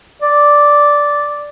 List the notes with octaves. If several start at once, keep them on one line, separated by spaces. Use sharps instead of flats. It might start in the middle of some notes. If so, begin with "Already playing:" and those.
D5